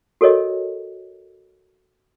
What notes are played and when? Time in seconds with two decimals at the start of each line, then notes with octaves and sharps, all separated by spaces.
0.21 F#4 A4 A#4 C#5 D#5